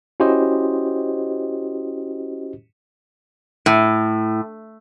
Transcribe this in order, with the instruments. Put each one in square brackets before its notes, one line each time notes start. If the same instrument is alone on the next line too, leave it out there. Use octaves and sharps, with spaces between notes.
[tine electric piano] C#4 E4 F#4 G4 C5 D#5
[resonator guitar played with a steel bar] A2